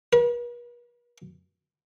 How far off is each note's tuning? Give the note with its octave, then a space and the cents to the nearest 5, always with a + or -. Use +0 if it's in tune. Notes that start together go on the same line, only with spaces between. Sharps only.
B4 -45